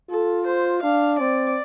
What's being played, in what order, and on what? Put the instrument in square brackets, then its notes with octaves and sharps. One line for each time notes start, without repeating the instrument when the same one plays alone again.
[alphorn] F4 [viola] A4
[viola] C5
[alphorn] D4 [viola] F5
[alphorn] C4 [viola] D5